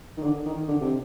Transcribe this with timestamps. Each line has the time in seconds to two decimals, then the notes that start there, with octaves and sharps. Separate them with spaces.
0.17 D#3
0.23 D3
0.46 D#3
0.68 D3
0.81 C3